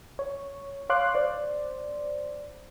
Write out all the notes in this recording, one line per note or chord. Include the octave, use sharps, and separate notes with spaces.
C#5
C#5 F5 C6 D6 F#6
C5 D5